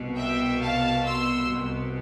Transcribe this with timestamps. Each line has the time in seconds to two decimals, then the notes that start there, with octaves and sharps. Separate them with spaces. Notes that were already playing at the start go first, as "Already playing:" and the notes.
Already playing: C2 B2
0.16 E5 G5
0.60 F5 A5
1.05 C6 E6
1.50 C2 B2